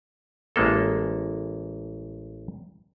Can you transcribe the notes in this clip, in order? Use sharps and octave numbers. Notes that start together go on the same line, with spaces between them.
A1 G#3 A#3 A4